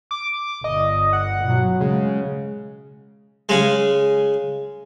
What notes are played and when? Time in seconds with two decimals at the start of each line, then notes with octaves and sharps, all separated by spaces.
0.11 D6
0.64 G1 D#5
1.13 F#5
1.44 B2 F#3
1.80 C#3 G#3
3.49 C#3 G#3